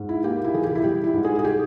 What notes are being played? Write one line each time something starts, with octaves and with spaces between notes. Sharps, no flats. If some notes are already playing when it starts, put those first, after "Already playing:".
Already playing: G#2
E4
A#3 G4
E4
E3 G#4
G4
E4
G3 G4
E4
G#2
G#4
G#4
G4